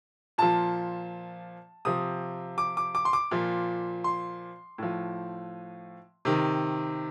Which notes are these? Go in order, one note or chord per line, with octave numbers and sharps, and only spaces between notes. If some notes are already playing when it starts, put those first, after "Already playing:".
A#2 F3 A5
C3 F3 D#6
D6
D6
D6
C6
D6
A#2 F3
C6
A2 F3
C3 D#3